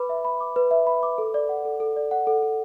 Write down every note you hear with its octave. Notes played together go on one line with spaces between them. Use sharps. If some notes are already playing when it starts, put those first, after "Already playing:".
Already playing: B4 B5 D6
E5
B5
D6
B4
E5
B5
D6
A4
D5
F#5
A4
A4
D5
F#5
A4
A4